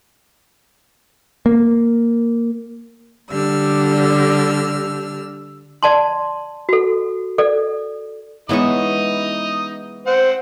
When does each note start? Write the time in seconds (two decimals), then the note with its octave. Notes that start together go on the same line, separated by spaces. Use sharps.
1.46 A#3
3.29 D3 G3 E6 F6
5.83 D5 A5 C6
6.69 F#4 A4
7.38 A4 D5
8.49 E3 G#3 B3 C#4 D#4 E4 D#5 C#6
10.06 C4 C5 F#5